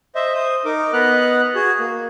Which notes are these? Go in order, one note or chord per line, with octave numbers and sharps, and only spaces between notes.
C5 D#5 E5
C5 D#6
D#4 A#4 D6
B3 B4 D#5 F#5 F6 F#6
F#4 G#4
A#3